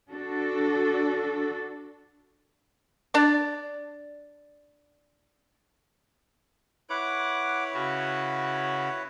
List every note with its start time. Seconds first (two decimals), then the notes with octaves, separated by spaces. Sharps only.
0.11 D4 F#4 A4
3.14 D4 D5
6.89 E4 B4 C#5 F#5 D6
7.73 C#3 F#4